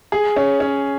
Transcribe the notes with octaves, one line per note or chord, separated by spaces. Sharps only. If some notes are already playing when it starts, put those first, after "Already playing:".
G#4
C#4
C#4